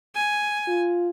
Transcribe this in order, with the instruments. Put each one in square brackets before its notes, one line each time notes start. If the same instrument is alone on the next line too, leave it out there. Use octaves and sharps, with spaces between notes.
[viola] G#5
[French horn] F4